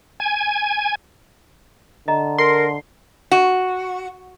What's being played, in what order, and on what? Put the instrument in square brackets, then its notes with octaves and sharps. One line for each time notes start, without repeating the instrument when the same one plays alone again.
[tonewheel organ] G#5
[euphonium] D3 [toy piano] D#5 A#5
[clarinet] A#4 [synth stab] C6
[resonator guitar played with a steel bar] F#4